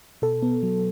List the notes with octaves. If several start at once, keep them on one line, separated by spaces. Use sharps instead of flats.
B2 A4
B3
F#3